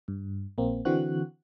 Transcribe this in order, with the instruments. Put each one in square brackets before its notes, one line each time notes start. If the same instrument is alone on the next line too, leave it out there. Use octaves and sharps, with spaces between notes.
[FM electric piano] G2
A#1 A#3 C4
D3 E3 C4 F#4 F#6